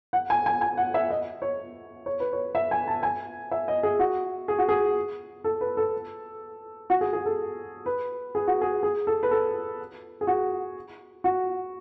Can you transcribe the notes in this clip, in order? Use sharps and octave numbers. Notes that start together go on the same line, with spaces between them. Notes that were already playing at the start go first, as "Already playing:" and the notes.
F#5
G#5
G#5
G#5
F#5
E5
D#5
C#5
C#5
B4
C#5
E5
G#5
A5
G#5
E5
D#5
G#4
F#4
G#4
F#4
G#4
A4
B4
A4
F#4
G#4
G#4
A4
B4
G#4
F#4
G#4
G#4
A4
B4
A4
G#4
F#4
F#4